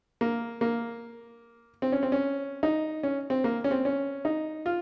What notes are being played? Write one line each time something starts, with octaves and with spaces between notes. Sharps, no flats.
A#3
A#3
C4
C#4
C4
C#4
D#4
C#4
C4
A#3
C#4
C4
C#4
D#4
F4